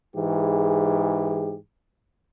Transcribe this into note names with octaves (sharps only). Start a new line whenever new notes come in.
G#2 E3 G4 G#4